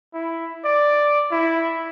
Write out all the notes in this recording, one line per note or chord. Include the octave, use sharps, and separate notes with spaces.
E4
D5
E4